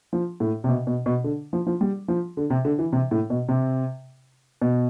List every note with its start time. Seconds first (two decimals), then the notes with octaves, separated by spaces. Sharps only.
0.13 F3
0.40 A2
0.64 C3
0.69 B2
0.87 B2
1.06 B2
1.24 D3
1.53 F3
1.67 F3
1.81 G3
2.08 F3
2.37 D3
2.50 C3
2.65 D3
2.79 E3
2.93 C3
3.11 A2
3.30 B2
3.48 C3
4.62 B2